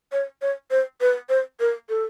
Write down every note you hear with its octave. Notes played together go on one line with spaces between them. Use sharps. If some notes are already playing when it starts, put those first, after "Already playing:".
C#5
C#5
C5
B4
C5
A#4
A4